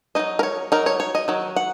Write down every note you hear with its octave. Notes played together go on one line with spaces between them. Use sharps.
F#3 A#3 D#4 D#5
A#4
C#5
F#3 D#4 A#4
C#5
C#5
D#5
D#3 F#3
F#5